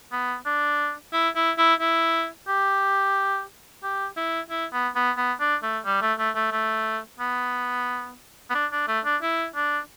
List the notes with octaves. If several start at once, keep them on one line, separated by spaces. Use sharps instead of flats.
B3
D4
E4
E4
E4
E4
G4
G4
E4
E4
B3
B3
B3
D4
A3
G3
A3
A3
A3
A3
B3
B3
D4
D4
A3
D4
E4
D4